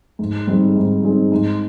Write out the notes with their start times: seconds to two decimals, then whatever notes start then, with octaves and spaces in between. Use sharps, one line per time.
0.19 G#2
0.47 G3 C4 D#4 G#4
0.75 G#2
1.03 G3 C4 D#4 G#4
1.32 G#2